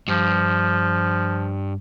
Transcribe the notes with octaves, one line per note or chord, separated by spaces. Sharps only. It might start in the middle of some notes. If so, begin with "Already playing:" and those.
G2 F3